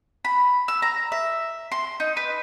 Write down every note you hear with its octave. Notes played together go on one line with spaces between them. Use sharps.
B5
E6
A#5
E5
C6
D#4
B4